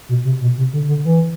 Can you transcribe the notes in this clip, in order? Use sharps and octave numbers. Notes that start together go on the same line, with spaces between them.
B2
C3
B2
C3
D3
D3
E3